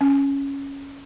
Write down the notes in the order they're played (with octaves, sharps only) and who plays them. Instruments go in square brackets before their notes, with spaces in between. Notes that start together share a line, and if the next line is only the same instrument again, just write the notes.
[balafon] C#4